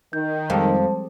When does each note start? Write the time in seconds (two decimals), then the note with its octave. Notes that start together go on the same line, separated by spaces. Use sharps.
0.13 D#3 G6
0.50 F2 F3 G3 G#3 C5 A5